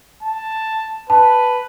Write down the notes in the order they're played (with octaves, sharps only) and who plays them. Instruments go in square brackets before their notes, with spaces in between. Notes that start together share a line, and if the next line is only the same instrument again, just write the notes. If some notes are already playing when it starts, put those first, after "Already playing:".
[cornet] A5
[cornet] B4 [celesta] A5